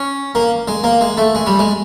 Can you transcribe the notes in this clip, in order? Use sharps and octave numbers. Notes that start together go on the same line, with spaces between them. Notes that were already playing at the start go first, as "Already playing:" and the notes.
Already playing: C#4
A#3
G#3
A#3
G#3
A3
G#3
G3
G#3